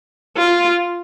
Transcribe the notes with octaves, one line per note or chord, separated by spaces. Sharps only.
F4